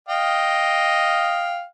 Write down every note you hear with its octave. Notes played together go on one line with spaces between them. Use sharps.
D#5 F5 G5